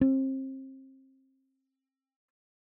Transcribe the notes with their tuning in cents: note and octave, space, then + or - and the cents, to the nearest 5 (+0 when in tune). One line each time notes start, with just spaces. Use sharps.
C4 +30